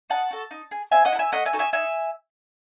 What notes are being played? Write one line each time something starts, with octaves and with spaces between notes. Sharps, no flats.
D#4 F#5 A5
F#4 A4
D#4
G#4
C4 E5 G#5
D#5 F#5
E4 A4
E5 G#5
A3 D#5 F#5
E5 G#5
D#4 F#4 A4
E5 G#5
D#4 E5 G#5